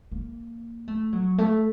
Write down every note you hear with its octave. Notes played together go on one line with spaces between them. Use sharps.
A#3
A3
F#3
A3